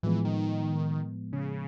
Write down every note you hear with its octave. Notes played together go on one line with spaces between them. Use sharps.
A2 E3 F3 G#3 B3
D#3
C#3